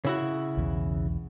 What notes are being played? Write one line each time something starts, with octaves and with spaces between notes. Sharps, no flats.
C#3 E4 F#4
B1 E2